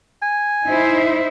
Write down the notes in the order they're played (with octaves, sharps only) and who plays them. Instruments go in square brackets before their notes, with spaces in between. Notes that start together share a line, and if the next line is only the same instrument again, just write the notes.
[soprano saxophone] G#5
[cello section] D#4 E4 C5